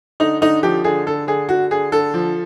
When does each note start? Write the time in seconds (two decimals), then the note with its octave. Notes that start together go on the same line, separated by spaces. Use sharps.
0.20 D3 D#4
0.41 D3 D#4
0.63 F3 G4
0.84 D3 G#4
1.06 D3 A4
1.27 D3 G#4
1.49 D3 F#4
1.71 D3 G#4
1.92 D3 A4
2.14 F3